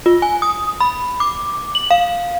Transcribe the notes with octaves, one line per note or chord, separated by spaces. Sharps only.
F4
G#5
D#6
B5
D6
F#7
F5